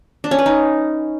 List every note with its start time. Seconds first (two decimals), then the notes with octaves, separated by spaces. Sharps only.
0.24 D4
0.31 C#4
0.39 B4
0.46 D#4